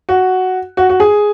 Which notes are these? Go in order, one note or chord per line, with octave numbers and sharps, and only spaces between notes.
F#4
F#4
F#4
G#4